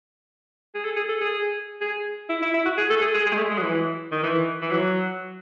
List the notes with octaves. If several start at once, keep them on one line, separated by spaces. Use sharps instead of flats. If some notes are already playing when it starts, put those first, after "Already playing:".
G#4
A4
G#4
A4
G#4
G#4
E4
E4
E4
F#4
G#4
A4
G#4
G#4
G#4
G#3
A3
G#3
F#3
E3
D#3
E3
E3
F#3